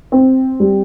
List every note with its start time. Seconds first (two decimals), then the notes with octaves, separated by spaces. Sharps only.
0.12 C4
0.60 G3